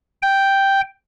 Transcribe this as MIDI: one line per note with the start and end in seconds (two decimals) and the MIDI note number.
0.23 0.81 79